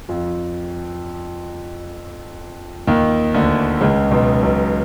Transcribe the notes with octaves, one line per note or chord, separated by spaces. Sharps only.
F2 F3
D#2 D#3
D2 D3
C#2 C#3
B1 B2
B1 B2